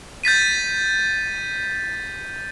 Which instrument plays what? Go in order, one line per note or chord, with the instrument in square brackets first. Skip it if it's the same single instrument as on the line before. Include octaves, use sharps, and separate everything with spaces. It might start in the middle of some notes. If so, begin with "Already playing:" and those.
[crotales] G6 A6 B6 D#7